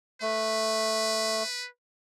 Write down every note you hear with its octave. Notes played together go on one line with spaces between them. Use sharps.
A3 B4